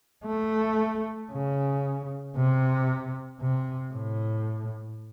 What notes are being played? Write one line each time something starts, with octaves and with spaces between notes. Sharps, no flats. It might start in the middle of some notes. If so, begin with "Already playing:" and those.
A3
C#3
C3
C3
A2